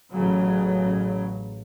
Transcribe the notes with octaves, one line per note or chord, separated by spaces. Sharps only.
A1 C#3 F#3